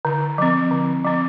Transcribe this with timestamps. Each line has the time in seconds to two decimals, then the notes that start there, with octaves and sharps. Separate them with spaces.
0.05 D3
0.38 F3 C4
0.71 D3
1.05 F3 C4